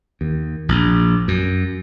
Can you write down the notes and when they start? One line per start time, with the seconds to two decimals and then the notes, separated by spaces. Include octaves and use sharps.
0.21 D#2
0.69 A#1
1.28 F#2